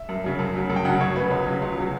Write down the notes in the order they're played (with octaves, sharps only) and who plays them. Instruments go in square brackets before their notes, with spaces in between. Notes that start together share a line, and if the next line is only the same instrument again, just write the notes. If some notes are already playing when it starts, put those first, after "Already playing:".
Already playing: [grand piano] E5
F#2
C#3 F#3
F#2
C#3 F#3
F#2
G5
C#3 F#3 F#5
F#2 C#5
C#3 F#3 B4
C#2
C#3 F#3
C#2
C#3 F#3